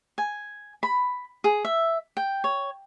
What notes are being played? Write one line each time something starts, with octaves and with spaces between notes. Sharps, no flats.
G#5
B5
G#4
E5
G5
C#5